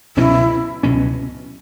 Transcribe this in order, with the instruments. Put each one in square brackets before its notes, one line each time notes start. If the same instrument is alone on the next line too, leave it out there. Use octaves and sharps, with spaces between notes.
[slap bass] C#2 B2 F#3 C#4 [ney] E4
[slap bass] C#2 B2 F#3 C#4